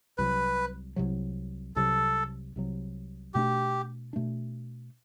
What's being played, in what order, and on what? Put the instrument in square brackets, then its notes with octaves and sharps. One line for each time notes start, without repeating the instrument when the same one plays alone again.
[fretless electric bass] C2 C3 F#3 [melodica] B4
[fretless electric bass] C2 C3 F#3
[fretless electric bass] C2 C3 F#3 [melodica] A4
[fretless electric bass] C2 C3 F#3
[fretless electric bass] B2 A3 D4 [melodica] G4
[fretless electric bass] B2 A3 D4